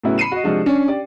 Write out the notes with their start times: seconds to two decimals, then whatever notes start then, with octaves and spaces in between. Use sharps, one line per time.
0.04 A2 C#3 F#3 B3 C#4 E4
0.18 B5 C7 C#7 D#7 E7
0.32 F#4 D#5
0.44 C3 F3 G#3 D4 F#4
0.66 C#4 D4
0.88 G4 D5